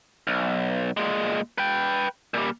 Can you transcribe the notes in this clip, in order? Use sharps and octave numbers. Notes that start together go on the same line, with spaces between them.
B1
A#2 G#3
B4 G5
A#2 G3